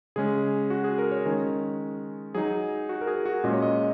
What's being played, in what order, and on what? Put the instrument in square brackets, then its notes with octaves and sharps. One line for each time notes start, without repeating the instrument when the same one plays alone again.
[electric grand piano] C#3 G#3 C#4 G#4
F#4
G#4
A#4
C#5
D#3 G#3 C#4
F#3 D#4 G#4
F#4
A#4
G#4
F#4
A#2 G#3 C#4 D#5
C#5
D#5